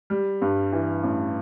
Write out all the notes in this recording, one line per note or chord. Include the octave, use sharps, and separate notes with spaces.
G3
G2
E3
A1